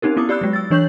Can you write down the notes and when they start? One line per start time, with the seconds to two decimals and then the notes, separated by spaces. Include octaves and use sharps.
0.02 C4 C#4 D#4 G4 A#4
0.17 B3 E4 D6 D#6
0.29 G4 D5 B5 E6 F#6
0.41 F#3 G#3
0.53 E6 A6
0.70 E3 D4 C#5 C#6 G6 F#7